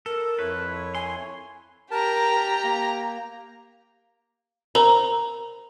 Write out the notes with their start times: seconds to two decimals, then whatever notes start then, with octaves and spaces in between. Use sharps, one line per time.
0.06 A4 A#4
0.39 F2 E4 B4 C#5
0.95 G#5 C6
1.91 G4 A#4 A5 A#5
2.63 A#3
4.75 A#4 C5 A#5